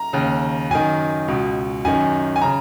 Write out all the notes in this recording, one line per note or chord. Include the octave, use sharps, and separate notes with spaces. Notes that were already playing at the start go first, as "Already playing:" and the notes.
Already playing: A#5
D#2 C#3
F#2 D#3 G#5
C#2 B2
F#2 D#3 G#5
G#5
C#3 A#5